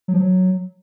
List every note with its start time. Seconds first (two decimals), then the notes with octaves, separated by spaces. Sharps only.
0.08 F#3
0.14 F3
0.19 F#3